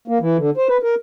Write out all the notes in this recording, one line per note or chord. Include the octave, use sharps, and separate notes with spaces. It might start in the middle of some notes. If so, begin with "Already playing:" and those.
A#3
E3
D3
C5
B4
A#4